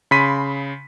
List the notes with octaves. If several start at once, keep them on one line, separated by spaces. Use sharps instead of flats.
C#3 B5 C6 B6 D#7